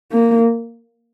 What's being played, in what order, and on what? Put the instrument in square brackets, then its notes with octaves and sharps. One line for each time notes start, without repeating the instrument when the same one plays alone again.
[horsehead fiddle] A#3